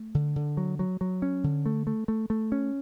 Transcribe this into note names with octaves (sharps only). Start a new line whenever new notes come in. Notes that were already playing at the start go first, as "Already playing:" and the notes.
Already playing: A3
D3
D3
F#3
F#3
F#3
C#4
D3
A3
A3
A3
A3
C#4